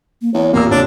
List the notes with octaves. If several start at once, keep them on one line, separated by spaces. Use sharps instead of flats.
A#3
E2 C#5
G#1 D#2 A#2 A#3 B3 E6
D#2 C3 D4 C#5